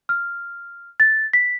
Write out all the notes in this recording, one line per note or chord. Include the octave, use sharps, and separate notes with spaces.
F6
A6
B6